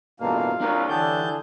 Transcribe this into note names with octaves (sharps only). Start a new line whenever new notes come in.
A1 G2 B2 A#3 F4 F5
C2 D4 G4 A#4 C#5
D3 E3 G#4 A5 G6